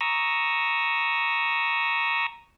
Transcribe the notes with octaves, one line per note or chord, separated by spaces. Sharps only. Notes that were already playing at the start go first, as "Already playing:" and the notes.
A#5 C#6 D#6 E6